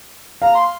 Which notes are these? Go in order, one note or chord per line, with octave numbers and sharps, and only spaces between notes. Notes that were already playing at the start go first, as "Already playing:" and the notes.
F5 A#5
C6